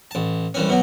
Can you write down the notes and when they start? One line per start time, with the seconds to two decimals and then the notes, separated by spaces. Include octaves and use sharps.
0.11 A1 A5
0.54 C2 E3 C#4
0.69 B2 F#3